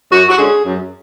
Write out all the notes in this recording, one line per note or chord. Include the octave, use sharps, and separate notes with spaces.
F#2 F#4
F#4
D3 G#3 C#4 G#4
F#2